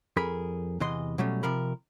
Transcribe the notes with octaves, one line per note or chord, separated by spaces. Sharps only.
F2 G#4 A#4 B5
E2 C3 E3 D#5 C6
B2 F#3 G3 A3 C#4
C3 F3 A#4 B5